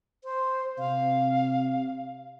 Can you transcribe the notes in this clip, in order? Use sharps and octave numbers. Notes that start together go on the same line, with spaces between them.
C5
C3 F5